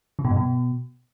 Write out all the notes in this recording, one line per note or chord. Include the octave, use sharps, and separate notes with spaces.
C#3
B2
G2
B2